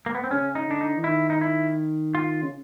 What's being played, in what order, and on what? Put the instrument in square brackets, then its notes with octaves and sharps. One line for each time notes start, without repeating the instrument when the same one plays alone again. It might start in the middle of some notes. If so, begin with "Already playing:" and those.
[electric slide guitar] A#3
B3
C4
[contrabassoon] C#3 [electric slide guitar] C#4
[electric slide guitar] D#4
[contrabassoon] D3 [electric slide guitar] D4
[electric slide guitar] D#4
[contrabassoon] E3
[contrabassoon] D#3 [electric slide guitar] E4
[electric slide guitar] D#4
E4
F4
[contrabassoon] C#3